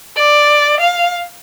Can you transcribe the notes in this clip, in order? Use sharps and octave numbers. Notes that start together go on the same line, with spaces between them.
D5
F5